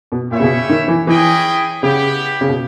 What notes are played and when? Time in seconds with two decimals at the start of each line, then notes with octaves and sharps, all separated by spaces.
0.12 B2
0.31 A#2 C#4 E4 G4 C#5 E5
0.40 C#3
0.43 B2
0.69 D#3
0.88 E3
1.07 E3 C#4 E4 G#4 D#5 G5
1.82 C#3 B3 E4 G4
2.41 C#3
2.49 B2